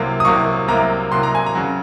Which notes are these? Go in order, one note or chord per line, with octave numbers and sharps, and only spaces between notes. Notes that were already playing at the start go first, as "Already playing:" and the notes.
Already playing: C2 C3 F#3 A#3
D#6
C2 C3 F#3 A#3 C#6
C2 C3 F#3 A#3 A#5
C2 C3 F#3 A#3 C6
A#5
G#5
A#5
C#3 F#3